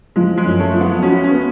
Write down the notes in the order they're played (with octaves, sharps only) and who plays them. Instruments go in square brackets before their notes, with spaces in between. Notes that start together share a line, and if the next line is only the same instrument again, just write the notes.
[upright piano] F3 [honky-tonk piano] G#3
[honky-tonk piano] G#3
[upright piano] F#2
[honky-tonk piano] A3
[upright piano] F3
[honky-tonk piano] B3
[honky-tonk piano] C#4 [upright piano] F#4
[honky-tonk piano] C#4
[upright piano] B3